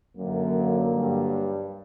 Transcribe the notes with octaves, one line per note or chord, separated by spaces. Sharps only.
F#2 D3 F#3 A#3
G2